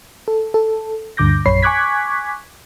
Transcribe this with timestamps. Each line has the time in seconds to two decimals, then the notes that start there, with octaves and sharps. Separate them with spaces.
0.28 A4
0.54 A4
1.17 D2 G2 D3 D6 G6 A#6
1.46 A#1 F#2 C#5 B5 C7
1.63 G#5 C#6 D6 F#6 G#6 B6